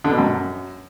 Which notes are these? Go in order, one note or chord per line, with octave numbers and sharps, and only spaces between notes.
D3
B2
F#2